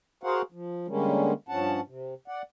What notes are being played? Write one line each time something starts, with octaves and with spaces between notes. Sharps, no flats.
F#4 G#4 A#4 C5 F5 F#5
F3
D3 G3 G#3 A#3 C#4
G2 F3 C#4 F#5 A5
C3
D5 F#5